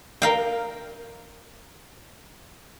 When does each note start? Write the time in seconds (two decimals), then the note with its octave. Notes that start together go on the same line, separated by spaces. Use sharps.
0.22 A#4 F5 G5